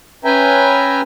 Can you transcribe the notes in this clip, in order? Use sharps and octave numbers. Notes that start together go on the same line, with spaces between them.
C#4 B4 E5 G5 G#5 A#5